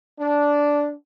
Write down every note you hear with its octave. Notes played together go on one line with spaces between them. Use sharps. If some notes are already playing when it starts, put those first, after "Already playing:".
D4